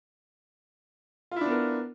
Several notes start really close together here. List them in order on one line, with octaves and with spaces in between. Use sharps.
F4 E4 D4 B3 A#4